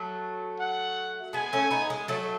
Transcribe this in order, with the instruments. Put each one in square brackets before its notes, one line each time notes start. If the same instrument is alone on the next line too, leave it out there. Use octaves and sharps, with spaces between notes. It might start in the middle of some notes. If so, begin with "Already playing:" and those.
Already playing: [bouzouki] F#3 A3
[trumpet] F#5
[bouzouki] G#3 B3 [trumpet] G#5
[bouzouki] A3 C#4
B3 D#4
G#3
F#3 A3